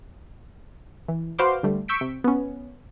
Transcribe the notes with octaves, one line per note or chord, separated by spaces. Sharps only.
E3
F#4 B4 C5 F5 C6 D6
D3 G3 A3
C#6 E6 G6 B6 D7
C3
B3 C#4